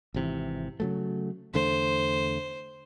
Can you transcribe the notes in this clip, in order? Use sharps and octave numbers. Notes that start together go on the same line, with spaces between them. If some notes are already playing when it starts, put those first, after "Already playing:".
G#1 C3 E3
C#3 F#3 A3
E2 D3 A3 C5